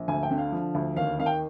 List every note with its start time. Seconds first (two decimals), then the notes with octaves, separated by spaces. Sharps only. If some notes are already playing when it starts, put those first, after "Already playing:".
Already playing: A#1
0.08 D2 G#5
0.23 G5
0.31 D3
0.38 F5
0.52 F3
0.75 D2
0.96 D#2 F5
1.19 D#3 F5
1.26 G5